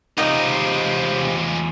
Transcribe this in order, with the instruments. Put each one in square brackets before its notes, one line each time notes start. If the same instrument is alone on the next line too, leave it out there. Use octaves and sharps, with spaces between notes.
[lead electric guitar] E2 F4 [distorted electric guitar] G#3 A3 [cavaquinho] D#4 D#5 [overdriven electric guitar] G4 C5